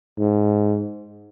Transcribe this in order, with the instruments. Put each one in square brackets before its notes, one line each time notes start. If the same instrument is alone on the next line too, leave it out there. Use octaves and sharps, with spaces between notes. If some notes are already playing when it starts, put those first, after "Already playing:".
[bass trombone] G#2